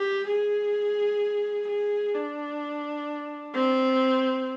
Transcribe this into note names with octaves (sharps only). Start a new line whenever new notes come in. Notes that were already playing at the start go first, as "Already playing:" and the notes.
Already playing: G4
G#4
G#4
D4
C4